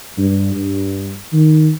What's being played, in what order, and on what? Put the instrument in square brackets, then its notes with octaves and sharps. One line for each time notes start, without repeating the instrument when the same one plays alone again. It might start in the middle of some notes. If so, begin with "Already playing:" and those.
[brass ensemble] G2
G2
D#3